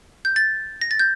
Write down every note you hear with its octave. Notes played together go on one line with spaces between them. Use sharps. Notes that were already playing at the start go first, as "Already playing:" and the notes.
G6
A6
A#6
A6
G6